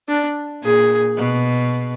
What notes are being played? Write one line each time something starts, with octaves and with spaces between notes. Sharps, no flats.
D4
A#2 G#4
B2